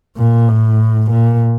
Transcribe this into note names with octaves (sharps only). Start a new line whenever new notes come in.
A#2
A2
A#2